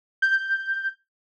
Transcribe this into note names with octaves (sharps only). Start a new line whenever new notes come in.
G6